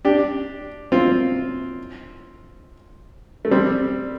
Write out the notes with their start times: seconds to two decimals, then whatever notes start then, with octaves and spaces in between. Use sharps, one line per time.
0.05 D4 G4
0.92 C4 F4
3.45 A3
3.51 G3 C4